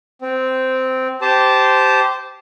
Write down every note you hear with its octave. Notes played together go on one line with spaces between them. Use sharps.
C4
G4 C5 A5